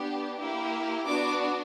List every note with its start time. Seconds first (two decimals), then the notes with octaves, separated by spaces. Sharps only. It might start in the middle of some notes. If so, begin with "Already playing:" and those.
Already playing: B3 D4 G4
0.40 A#3 E4 G4
1.06 B3 D4 F#4 D6